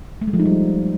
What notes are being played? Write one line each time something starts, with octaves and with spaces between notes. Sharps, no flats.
A3
G#3
F3
D#4
G3